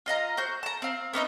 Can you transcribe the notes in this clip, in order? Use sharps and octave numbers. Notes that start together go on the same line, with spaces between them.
F4 D#5 F5 A#5
F#4 C5 G6
A5 A#5
C4 F5
B3 C#4 D#4 E5